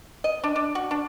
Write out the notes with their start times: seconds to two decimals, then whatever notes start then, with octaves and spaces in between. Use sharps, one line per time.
0.24 D#5
0.44 D4
0.56 D4
0.75 F#4
0.91 D4